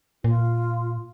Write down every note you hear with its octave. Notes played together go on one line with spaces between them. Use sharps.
A#2 F4